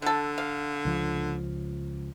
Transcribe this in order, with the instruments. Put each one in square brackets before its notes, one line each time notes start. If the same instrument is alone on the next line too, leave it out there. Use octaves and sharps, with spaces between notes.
[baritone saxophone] D3 [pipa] A4 F#5
[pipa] F5
[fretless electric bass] C#2 F3